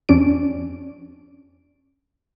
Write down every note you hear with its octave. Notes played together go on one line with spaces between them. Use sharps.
F2 C#4 D4 D7